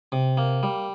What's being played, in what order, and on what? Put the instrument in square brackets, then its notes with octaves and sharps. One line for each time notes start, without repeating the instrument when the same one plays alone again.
[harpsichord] C3
A#3
G3